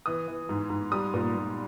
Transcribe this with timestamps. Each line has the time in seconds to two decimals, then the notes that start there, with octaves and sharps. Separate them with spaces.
0.06 E3 D#6
0.28 E3
0.49 G#2
0.70 G#2
0.92 G3 D#6
1.14 A#2
1.34 A#2